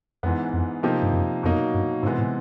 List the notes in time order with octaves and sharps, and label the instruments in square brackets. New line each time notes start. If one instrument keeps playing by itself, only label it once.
[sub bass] F2 [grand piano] G#2 E3 G#3 B3
[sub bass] F2
[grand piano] C3 F3 A#3 D#4 G4
[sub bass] G2
F#2
[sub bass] F2 [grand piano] B2 F#3 A#3 D#4
[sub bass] G2
[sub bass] G#2 [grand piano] C3 E3 G#3 B3
[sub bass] A2